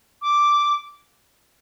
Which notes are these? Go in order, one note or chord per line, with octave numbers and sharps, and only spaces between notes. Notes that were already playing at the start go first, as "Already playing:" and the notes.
D6